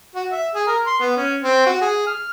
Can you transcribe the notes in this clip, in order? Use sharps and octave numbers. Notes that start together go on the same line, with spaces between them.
F#4
E5
G#4
A#4
C6
B3
C#4
C4
F#4
G#4
F6